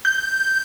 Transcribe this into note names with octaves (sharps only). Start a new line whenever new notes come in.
G6